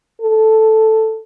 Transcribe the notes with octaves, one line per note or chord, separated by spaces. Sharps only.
A4